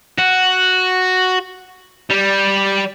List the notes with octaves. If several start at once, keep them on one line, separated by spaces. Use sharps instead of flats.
F#4
G3